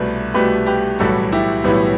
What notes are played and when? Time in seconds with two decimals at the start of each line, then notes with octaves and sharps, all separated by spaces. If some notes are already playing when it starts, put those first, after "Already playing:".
Already playing: C2 B2 A3 B4
0.34 C2 B2 A3 G4 B4
0.66 G4 B4
0.99 B1 A2 E3 G3 F#4 A4
1.32 E4 G4
1.64 B1 A2 E3 G3 B3